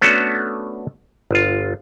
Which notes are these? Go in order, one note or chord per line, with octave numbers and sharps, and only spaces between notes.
A3 B3 C#4 D4 F#4 A4
G1 F4